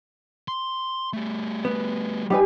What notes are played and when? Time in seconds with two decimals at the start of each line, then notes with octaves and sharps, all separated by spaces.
0.48 C6
1.13 G3 A3
1.65 B3
2.30 G3 D#4 G4 B4 G#5